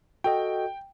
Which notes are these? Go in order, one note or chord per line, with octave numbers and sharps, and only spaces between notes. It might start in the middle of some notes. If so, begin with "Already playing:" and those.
F#4 A4 D#5 G5